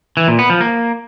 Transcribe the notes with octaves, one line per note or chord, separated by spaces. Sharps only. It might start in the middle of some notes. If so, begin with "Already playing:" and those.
E3
A#2
B3
F3
A#3